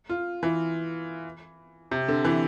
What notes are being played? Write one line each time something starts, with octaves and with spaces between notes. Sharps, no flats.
F4
E3
C3
D3
E3